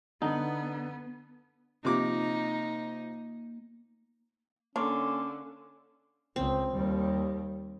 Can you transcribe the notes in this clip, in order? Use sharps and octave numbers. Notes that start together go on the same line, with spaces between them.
D3 B3 D#4
C3 F3 A#3 D#4 D6
D3 A#3 C#4 D4 A#4 C#5 C6 D6
C#2 C4
D#2 G3